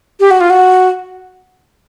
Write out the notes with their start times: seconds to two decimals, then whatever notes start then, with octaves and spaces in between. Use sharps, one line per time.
0.20 G4
0.31 F#4
0.41 F4
0.50 F#4